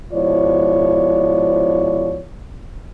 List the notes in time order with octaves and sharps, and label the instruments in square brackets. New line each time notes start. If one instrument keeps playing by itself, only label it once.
[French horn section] G#2 B2 F3 E4 C#5 D5